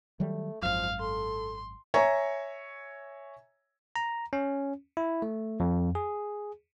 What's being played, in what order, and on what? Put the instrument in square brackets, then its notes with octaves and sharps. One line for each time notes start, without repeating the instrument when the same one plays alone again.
[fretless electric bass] D#3 F#3 G3 [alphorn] A3
[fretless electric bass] G#1 F#2 [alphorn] F3 [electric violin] F5
[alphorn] A4 [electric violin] C6
[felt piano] C#5 E5 G#5 A#5 C#6
[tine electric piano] A#5
C#4
E4
A3
F2
G#4